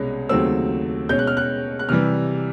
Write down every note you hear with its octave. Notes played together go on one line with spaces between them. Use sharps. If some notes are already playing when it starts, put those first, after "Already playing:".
Already playing: C2 B2 G#3 C#4
D#2 C#3 F#3 A3 C4 E6
B2 G#3 C#4 G6
F#6
F6
F#6
F#6
C3 E3 G3 F6